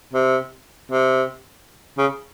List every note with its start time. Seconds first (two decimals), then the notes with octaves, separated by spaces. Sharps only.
0.13 C3
0.92 C3
1.98 C#3